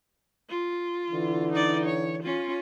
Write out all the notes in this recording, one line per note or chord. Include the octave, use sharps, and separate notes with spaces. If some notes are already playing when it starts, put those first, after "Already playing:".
F4
D3 E3
D#4 D5
C#5
C#4 F4